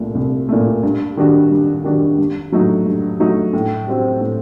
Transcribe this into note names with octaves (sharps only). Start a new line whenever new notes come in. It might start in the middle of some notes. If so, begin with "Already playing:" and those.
Already playing: C2 A#2 A3
C2
A#2 A3
G2
D#3 G3 D4 F#4
G2
D#3 G3 D4 F#4
G2
F#3 A3 D#4 F#4
G2
F#3 A3 D#4 F#4
A2
G3 C4 F#4
A2